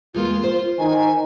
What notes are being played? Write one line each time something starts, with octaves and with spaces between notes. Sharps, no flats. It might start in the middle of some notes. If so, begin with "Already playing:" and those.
E2 G#3 A#3 F4
C5
D#3 G#5